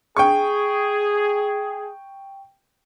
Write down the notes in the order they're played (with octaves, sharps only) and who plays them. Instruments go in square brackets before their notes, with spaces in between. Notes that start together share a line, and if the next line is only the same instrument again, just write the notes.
[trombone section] G#4 [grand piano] G5 C#6